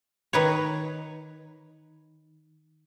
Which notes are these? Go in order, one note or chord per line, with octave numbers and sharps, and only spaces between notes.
D#3 B4 C#5